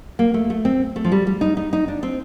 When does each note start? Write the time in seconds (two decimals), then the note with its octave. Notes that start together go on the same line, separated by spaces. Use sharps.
0.19 A#3
0.34 A3
0.50 A3
0.65 C4
0.96 A3
1.04 F3
1.12 G3
1.27 G3
1.41 D#4
1.57 D#4
1.73 D#4
1.88 D4
2.03 C4